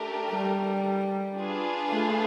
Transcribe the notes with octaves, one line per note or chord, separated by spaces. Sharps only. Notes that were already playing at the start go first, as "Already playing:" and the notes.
Already playing: A3 D4 G4 A#4
G3
D4 F4 G#4 B4
A3